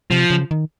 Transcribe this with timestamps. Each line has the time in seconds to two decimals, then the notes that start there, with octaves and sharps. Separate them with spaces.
0.11 C3 F3
0.30 C#3
0.51 D#3